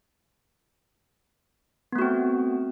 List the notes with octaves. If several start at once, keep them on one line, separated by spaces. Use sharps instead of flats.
A3 B3 C4 F#4